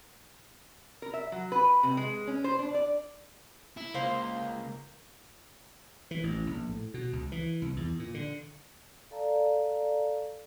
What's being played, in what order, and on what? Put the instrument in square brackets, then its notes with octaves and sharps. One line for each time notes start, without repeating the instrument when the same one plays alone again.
[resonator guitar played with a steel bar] A#4
E5
F#3
B4
C3
G#3
C#4
C5
D4
D5
[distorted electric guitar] E4
[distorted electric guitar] C#2 [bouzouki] A#3 C5
[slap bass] E3
A1
A#1
A2
B2
C#2
E3
C2
E2
A#2
D3
[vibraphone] A4 D5 F5 A5 A#5